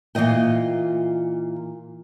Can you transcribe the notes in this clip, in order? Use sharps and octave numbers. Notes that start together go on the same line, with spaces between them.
A#2 E3 F4 D#5 G5